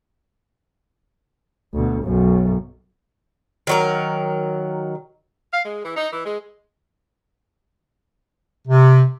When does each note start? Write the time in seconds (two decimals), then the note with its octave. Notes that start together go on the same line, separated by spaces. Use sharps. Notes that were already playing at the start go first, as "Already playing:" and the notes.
1.74 D2 B2
2.04 B1 F#2
3.67 D#3 F#3 A#4
5.53 F5
5.64 G#3
5.84 E3
5.96 D#4
6.13 E3
6.25 G#3
8.68 C3